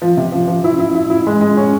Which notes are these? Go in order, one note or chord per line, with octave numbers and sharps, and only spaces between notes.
F3
C3
F3
F3
E4
E4
E4
E4
G#3
G#3
C#4